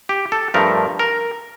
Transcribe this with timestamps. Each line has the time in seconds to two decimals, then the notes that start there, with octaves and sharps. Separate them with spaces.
0.09 G4
0.32 A4
0.54 G2 F3 A3 A#4
0.99 A#4